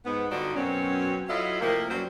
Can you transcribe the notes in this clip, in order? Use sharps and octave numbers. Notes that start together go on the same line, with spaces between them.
G#2 B3
G2 D3 D4 D#4 F4 F#4
F#2 B2 F#3 C4 C#4
F#3 E4 F4 A4 D#5 F5
A2 C3 F3 A#3
F#2 F#3 G3 C#4 C5